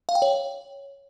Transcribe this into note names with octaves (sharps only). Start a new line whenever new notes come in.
F5
G5
C#5